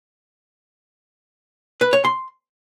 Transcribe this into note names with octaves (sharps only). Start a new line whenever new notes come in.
B4
C#5
C6